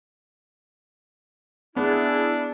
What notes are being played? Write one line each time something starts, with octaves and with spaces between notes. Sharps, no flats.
B3 D4 E4 G#4